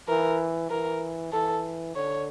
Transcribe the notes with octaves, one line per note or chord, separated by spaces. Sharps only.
E3 A#4
E3 A#4
E3 A4
D3 C#5